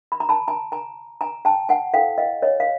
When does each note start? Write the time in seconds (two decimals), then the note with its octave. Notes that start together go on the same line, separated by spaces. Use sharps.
0.12 B5
0.20 A#5
0.29 A5 B5
0.48 G#5 A#5
0.72 G#5 A#5
1.21 G#5 A#5
1.45 G5 A5
1.69 F#5 G#5
1.94 E4 A4 C5 F5 G5
2.18 D#5 F5
2.42 C#5 D#5
2.60 F5